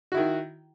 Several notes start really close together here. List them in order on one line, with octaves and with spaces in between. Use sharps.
F#4 E4 D#3